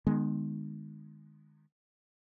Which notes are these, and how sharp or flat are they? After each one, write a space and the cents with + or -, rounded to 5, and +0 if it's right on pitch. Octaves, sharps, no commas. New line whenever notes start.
D#3 -35 G#3 +0 B3 +0